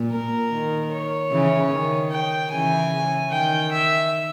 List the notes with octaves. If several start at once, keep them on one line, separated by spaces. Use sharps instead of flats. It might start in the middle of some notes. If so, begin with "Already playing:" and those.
Already playing: A#2
A#4
D#3
C#5
C#3 E3
D#3
G5
C#3 E3 G#5
D#3 G5
E5